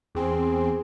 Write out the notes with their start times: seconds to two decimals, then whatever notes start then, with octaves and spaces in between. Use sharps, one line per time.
0.15 E2 C4 G#4